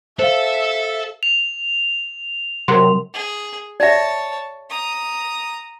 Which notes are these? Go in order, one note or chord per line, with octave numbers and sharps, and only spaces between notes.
A4 C5 E5 F5
F7
C3 F#3 A#4 C6
G#4
C#5 D5 E5 A5
A#5 D#6